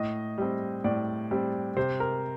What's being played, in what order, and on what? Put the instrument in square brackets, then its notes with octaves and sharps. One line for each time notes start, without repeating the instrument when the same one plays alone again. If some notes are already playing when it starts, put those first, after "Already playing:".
Already playing: [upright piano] A2 D#5
G3 C4
A2 D5
G3 C4
C3 C5
A#4